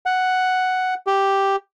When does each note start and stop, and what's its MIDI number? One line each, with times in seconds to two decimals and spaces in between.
0.06 0.94 78
1.07 1.56 67